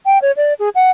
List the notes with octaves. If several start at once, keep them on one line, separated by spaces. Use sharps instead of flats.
G5
C#5
D5
G#4
F#5